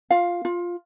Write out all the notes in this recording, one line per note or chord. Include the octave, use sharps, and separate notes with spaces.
F4 F5
F4